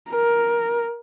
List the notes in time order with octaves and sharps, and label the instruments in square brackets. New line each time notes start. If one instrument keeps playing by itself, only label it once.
[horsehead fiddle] A#4